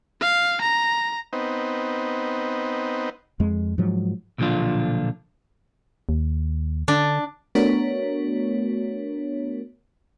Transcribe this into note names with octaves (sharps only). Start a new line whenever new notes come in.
F5
A#5
B3 C4 D#4
F2 G#3
G#2 F3 F#3
B1 A#2 D3 F3 D4 F4
D#2
D3 D4
A3 B3 D4 F#4 A#4 C#5